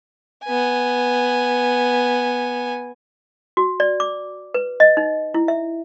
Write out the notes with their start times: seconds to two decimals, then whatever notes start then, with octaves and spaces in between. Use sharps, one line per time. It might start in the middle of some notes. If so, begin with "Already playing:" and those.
0.44 B3 G#5
3.57 F#4
3.80 D5
4.00 D6
4.54 B4
4.80 D#5
4.97 D#4
5.34 E4
5.48 E5